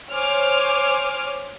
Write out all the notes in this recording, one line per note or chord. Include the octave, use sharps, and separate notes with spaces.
C5 C#5 G#5 D6 F6